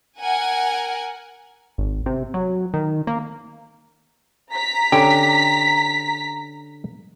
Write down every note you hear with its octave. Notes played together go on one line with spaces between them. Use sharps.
A#4 F#5 G#5
G#1
C3
F#3
D#3
A#3
A#5 B6
D3 C#4 G4